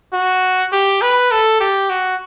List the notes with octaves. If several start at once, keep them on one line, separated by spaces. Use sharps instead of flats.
F#4
G4
B4
A4
G4
F#4